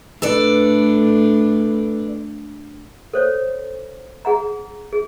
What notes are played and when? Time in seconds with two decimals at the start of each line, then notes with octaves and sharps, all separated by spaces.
0.22 A2 D4 A4 B4 D5
3.14 A4 C5 C#5
4.25 G#4 F#5 A#5
4.93 G#4